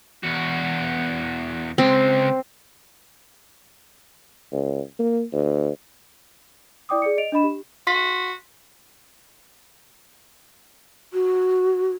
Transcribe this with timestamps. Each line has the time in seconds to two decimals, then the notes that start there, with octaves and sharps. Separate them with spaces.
0.23 E2 F#4
1.78 C#2 G#3 C4
4.52 C#2
4.99 A#3
5.32 D2
6.89 E4 D5 G5 D6 D#6
7.02 G#4 D5 C#7
7.18 D#5 D7 F7
7.32 D4 D#5 B5 E7
7.44 G4
7.87 F#4 C6 B6
11.13 F#4